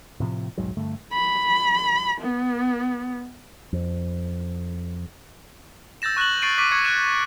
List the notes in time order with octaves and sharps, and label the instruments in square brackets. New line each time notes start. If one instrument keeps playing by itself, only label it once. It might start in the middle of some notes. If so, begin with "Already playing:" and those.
[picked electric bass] A2 C3 F3
D#1 B1 G#2 F#3
G2 D3 A3
[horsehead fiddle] B5
B3
[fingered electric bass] F2
[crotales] E6 G6 A6 A#6 E7
C#6 F#6 A#6 E7 F#7
C#6 A6 C7 D7 D#7
C#6 D6 B6 D7 D#7
C#6 G#6 C#7
F#6 D7 E7